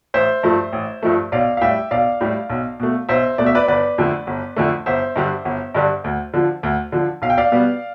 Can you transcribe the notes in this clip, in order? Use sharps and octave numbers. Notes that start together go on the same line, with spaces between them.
A1 C5 E5
G2 F3 A3
A1
G2 F3 A3
B1 D5 F5
F5
A2 G3 E5 G5
B1 D5 F5
A2 G3
B1
B2 A3
B1 C5 E5
B2 A3 D5
E5
B4 D5
G1 B4 D5
F2 D3 A3
G1
F2 D3 A3
G1 C5 E5
G2 D3 G3
G1
G2 D3 G3
D2
D3 F3
D2
D3 F3
B1 F5
G5
D5 F5
B2 G3 B3